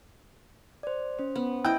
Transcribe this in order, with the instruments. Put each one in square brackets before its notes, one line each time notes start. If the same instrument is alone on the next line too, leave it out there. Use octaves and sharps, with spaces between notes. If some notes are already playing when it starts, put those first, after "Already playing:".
[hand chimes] C5 D5
C#4 C5
[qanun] B3
[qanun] E4 D#5 [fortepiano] G5